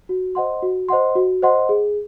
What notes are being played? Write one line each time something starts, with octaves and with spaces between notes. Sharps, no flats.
F#4
C5 D#5 F#5 C6
F#4
C5 D#5 F#5 C6
F#4
C5 D#5 F#5 C6
G#4